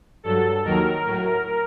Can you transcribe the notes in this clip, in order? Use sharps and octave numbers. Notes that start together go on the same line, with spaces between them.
G2 F#3 A4
D#2 D#3 F#3 A#4
A2 F#3